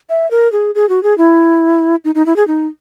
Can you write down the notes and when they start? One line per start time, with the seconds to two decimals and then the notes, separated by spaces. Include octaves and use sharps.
0.09 E5
0.31 A#4
0.52 G#4
0.75 G#4
0.89 F#4
1.03 G#4
1.18 E4
2.05 D#4
2.15 D#4
2.26 E4
2.36 G#4
2.47 D#4